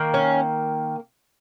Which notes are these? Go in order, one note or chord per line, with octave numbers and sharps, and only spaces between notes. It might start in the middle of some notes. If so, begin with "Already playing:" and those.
Already playing: D#3 A#3
C#4